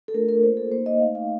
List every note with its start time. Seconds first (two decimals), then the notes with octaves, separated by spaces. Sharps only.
0.08 A4
0.14 A3 D4 F4 A#4
0.29 A#4
0.43 A#3 C5
0.46 F4
0.57 A4
0.71 A#3 D#4 C5
0.86 D#5
1.00 A3 D#4 F5
1.15 F5